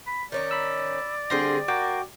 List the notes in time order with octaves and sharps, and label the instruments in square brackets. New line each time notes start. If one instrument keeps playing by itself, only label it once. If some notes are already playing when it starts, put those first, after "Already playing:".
[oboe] B5
[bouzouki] D#3 C#4 D#4 [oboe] D5
[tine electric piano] B5 E6
[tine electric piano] D3 C6 A#6 [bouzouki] G3 C4 G#4
[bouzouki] A#3 [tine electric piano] F#4 G5 D6